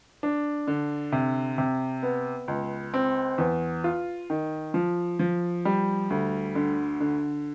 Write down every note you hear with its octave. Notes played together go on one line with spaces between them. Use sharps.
D4
D3
C3
C3
B3
C#2
C4
E2
F4
D#3
F3
F3
G3
D2
D3
D3